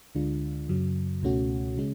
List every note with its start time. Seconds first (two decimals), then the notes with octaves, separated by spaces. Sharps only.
0.15 D2 D3 G#3 D4 F4
0.69 F#2 C#3 F#3
1.23 C#2 B2 A3 C#4 F#4
1.77 C#3 G#3 C#4